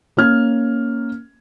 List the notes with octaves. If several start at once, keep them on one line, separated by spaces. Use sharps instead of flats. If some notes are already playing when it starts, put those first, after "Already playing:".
A#3 C#4 F6 G#6